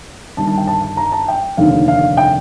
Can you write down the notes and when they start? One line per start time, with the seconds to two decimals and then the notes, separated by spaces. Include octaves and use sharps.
0.37 G1 G2 D#3 A5
0.47 A5
0.58 G5
0.67 A5
0.83 A5
0.97 A#5
1.12 A5
1.28 G5
1.57 F1 D#2 D3 F5
1.88 F5
2.17 G5